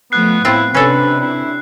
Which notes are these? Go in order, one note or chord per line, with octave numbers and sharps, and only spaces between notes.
F3 A3 B3 F#6 C7
A2 B3 C4 E4 F4
C3 C#4 D4 A4 B4
E4